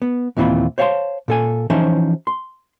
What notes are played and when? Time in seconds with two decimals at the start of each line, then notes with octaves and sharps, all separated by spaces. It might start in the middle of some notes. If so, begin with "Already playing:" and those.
0.02 B3
0.37 D#2 A#2 E3 C4 F4 B5
0.78 C5 C#5 F5 F#5 A5 C6
1.28 A#2 A4 G#5
1.70 E3 F3 C#4 D#4 C5 C#5
2.27 C6